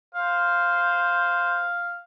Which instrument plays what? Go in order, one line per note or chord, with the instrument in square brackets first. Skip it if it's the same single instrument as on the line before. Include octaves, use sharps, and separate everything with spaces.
[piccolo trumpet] C5 [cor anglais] F5